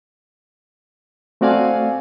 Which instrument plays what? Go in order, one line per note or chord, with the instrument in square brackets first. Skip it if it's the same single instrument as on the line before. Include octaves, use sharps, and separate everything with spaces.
[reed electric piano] A3 C4 F#4 D5 F5 G#5